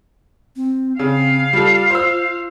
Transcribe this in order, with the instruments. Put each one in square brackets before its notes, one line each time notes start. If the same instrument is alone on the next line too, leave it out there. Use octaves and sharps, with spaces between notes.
[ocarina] C4
[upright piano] C#3 [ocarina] C4 [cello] F5
[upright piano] G3 A4 [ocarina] F4
[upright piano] C5 E6